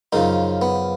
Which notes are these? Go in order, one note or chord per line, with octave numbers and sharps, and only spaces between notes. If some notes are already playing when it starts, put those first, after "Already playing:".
F#2 C#3 F3 D#4
B3